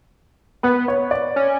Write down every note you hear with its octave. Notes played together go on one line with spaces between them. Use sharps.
B3 B4
C#5
D5
C#4